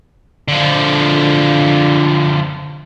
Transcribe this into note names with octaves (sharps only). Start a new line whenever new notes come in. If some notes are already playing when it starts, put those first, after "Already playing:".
D3 F3